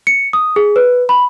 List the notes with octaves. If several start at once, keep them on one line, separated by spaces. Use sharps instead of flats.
C#7
D#6
G#4
B4
B5